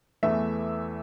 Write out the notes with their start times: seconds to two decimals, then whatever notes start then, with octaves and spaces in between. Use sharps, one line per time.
0.23 E2 E3 A3 E5